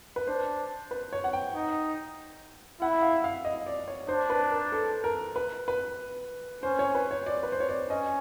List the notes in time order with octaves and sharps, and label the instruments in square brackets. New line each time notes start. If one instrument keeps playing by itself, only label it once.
[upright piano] B4
[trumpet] D4 [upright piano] C5
[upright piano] B4
C#5
F#5
G5
[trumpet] D#4
[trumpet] E4 [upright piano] F#5
[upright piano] F5
F5
D#5
D5
C#5
[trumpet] D4 [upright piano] C5
[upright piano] B4
A#4
A4
A#4
B4
B4
[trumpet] C#4 [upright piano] C5
[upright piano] C#5
B4
C#5
D5
B4
C5
C#5
D5
[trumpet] C#4 [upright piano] D#5